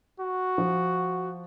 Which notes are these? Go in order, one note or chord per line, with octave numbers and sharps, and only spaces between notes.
F#4
F3